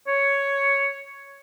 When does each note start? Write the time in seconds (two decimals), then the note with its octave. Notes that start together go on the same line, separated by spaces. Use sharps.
0.07 C#5